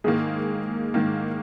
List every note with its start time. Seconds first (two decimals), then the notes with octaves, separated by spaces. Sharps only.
0.04 G#2 D#3 G#3 A#3 G#4
0.94 G#2 D#3 A#3